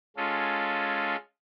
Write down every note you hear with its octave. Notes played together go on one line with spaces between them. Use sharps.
G#3 C#4 F4 A4